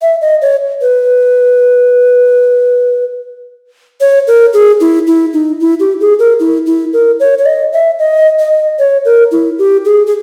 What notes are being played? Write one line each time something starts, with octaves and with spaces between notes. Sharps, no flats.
E5
D#5
C#5
B4
C#5
A#4
G#4
E4
E4
D#4
E4
G4
G#4
A#4
E4
E4
A#4
C#5
C#5
D#5
E5
D#5
D#5
C#5
A#4
E4
G4
G#4
G#4